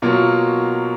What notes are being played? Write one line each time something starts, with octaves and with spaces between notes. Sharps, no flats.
B2 F#3 A#3 F4